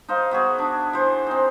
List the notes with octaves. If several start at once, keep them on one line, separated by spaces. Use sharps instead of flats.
D#4 C5 F5
B3 F#4 G#4
D4
E3 C5
C4 D#4